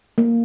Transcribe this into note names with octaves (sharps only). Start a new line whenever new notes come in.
A#3